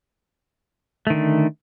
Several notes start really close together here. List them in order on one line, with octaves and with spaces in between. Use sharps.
A3 D#3 D3